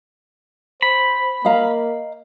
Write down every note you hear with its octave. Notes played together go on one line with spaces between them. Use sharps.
C5 B5
A#3 D#5 F5 A#5